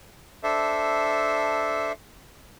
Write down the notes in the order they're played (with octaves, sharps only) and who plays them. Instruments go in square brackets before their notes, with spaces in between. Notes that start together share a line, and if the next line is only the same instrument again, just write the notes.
[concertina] D4 A4 C5 E5